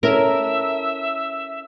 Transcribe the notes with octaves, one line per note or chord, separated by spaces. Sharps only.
C#4 E4 A4 A#4 E5